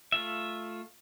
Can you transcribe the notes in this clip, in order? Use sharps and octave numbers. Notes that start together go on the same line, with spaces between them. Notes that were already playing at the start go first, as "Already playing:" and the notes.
A3 F4 E5